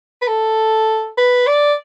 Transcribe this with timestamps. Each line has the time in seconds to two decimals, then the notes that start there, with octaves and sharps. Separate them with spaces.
0.22 B4
0.28 A4
1.18 B4
1.47 D5